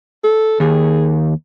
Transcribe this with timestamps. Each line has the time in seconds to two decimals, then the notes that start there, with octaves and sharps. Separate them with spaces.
0.24 A4
0.60 D#2 G#4